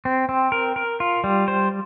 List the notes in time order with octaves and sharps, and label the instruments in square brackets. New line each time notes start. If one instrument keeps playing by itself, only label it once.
[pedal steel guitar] C4
C4
A#4
A#4
F4
G3
C5